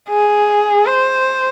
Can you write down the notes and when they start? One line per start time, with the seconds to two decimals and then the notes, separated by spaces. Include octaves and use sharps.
0.09 G#4
0.86 C5